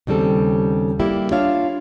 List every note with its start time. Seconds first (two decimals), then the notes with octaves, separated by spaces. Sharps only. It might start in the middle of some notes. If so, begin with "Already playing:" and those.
0.07 D#2 C#3 G3 C4 A4
0.99 G3 A#3 E4 G4
1.31 D4 F4 C#5 E5 F5